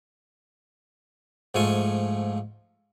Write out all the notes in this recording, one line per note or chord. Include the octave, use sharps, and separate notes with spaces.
G#2 F3 A3 F4 G#5 C#6